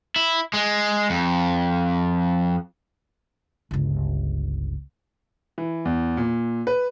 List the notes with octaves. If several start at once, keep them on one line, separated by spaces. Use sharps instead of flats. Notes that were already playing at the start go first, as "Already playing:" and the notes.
E4
G#3
F2
G1 C#2
E3
E2
A#2
B4